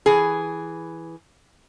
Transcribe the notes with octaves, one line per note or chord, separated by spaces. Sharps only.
E3 G#4